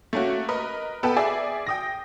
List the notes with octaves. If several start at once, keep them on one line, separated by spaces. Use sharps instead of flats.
A3 A#3 C#4 F#4
A#4 B4 D#5
B3 A4 B4 G5 A5
G#4 D5 E5
G5 D#6 A#6